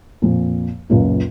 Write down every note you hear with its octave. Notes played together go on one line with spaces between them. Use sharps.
F2 A#2
C#2 F#2 A#2